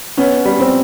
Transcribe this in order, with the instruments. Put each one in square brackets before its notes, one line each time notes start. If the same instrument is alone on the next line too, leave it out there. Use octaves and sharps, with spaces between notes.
[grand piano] B3 [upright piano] C#4
[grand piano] G3
[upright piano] C4